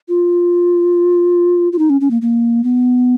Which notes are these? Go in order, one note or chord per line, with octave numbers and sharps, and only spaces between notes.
F4
F4
D#4
C#4
C#4
A#3
A#3
B3